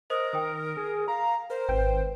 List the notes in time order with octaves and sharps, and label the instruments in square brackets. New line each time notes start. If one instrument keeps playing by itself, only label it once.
[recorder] A#4 [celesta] C5 D#5 D#6
[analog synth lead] D#3 [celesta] G5 D#6
[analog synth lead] G#4
[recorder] F5 [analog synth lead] A#5
[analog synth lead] A#4 [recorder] C5
[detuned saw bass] G#1 [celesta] B4 G6 [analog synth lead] G5